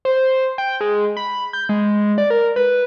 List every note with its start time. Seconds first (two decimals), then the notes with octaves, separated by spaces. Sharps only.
0.05 C5
0.58 G5
0.81 G#3
1.17 B5
1.53 G6
1.69 G#3
2.18 D5
2.30 A#4
2.56 B4